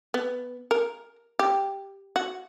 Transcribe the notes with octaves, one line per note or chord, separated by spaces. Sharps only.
B3
A#4
G4
F#4